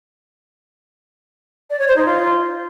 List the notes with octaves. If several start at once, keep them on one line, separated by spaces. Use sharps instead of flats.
D5
C#5
C5
D#4
F4